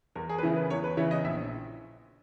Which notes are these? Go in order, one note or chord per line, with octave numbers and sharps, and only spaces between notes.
E2 A#4
G#4
B4
C#3 E3 B3 E4 A#4
B4
E2 C#5
B4
C#3 E3 B3 E4 C#5
D#5
A#1 E5